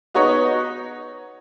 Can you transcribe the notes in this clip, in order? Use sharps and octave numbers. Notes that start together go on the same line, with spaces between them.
B3 D#4 F#4 C#5